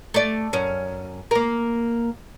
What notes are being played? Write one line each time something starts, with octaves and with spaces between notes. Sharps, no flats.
A3 D5
F#2 C#4
A#3 A#4